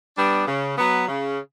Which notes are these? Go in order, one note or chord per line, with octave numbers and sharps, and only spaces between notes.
G3 B3 D4
C#3
F#3 B3
C#3